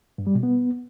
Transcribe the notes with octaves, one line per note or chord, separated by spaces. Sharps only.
G2
G3
B2
B3